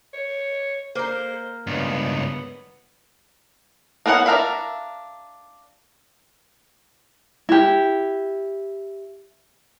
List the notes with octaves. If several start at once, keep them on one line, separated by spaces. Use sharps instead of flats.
C#5
A#3 A#4 C5
C#2 G2 B3
A#3 B3 C#4 A4 F#5
D4 A#4 E5 F5 B5
E4 G4